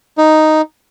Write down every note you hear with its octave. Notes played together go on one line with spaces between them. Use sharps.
D#4